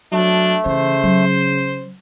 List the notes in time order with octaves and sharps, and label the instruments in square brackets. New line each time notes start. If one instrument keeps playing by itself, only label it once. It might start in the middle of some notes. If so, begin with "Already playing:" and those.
[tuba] F#3 [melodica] A3 [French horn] D4
[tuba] C#3 [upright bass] E3 [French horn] C5
[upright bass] F#3